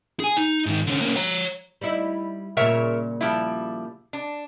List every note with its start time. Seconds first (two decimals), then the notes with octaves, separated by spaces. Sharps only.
0.20 G#4 G#5
0.37 D#4
0.66 G#2 D#3
0.87 D3 C#4
1.01 A#3 C#4
1.16 C#5 A#5
1.81 G3 D#4 E4
2.57 A#2 C#3 A#4 C#5 E5
3.21 F3 G3 E4
4.13 D4